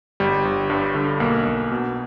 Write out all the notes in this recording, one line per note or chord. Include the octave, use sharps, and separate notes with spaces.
G1 G3
G1
G2
D3
B1 A#3
B1
B2